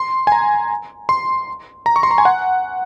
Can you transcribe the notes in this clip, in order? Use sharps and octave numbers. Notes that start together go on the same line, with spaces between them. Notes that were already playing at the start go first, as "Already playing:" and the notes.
Already playing: C6
G#5
A#5
C6
A#5
C#6
C6
A#5
G#5
F#5